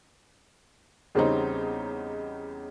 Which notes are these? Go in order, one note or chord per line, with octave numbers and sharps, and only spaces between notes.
E2 C#3 G3 C4 C#4 D#4